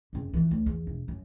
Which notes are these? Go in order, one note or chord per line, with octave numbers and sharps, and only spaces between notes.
F#1 C3
F2 E3
D2
E2
E1
F#2